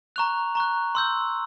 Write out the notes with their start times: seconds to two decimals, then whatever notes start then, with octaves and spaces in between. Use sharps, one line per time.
0.16 A#5 C#6 F#6 F7
0.55 A#5 C#6 F#6
0.95 C6 E6 G6